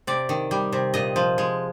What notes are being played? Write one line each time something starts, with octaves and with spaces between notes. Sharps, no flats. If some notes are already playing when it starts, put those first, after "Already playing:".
C3 D5
D#3
G3
C3
A#2 D#5
F3
G#3